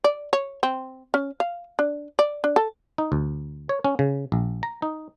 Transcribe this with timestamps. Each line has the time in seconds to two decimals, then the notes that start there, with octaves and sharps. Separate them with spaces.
0.04 D5
0.33 C#5
0.63 C4
1.14 C#4
1.40 F5
1.79 D4
2.19 D5
2.44 D4
2.56 A4
2.98 D#4
3.12 D2
3.69 C#5
3.84 C#4
3.99 C#3
4.32 A#1
4.63 A#5
4.82 D#4